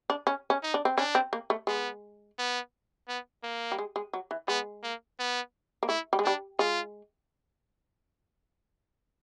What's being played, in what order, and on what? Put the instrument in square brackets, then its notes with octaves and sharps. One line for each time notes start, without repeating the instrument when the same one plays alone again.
[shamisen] D4
C#4
C#4
[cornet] D#4
[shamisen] D4
C4
[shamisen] C#4 [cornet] D4
[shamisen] C4
A#3
A3
[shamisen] G#3 [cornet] B3
[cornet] B3
B3
A#3
[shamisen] G3
G#3
G#3
F#3
E3
[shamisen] G#3 [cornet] B3
[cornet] A#3
B3
[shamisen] A#3
[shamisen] A3 [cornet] E4
[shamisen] G3
G#3
[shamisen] G3 [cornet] D4
[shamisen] G#3 [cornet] F4